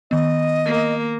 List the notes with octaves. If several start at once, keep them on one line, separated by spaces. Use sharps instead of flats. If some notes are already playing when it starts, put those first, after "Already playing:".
D#3 B3 D#5
A#3